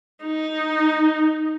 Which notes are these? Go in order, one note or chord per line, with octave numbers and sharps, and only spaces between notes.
D#4